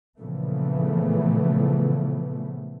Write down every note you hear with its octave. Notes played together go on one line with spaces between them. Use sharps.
A#2 C#3 E3 F3 A3 B3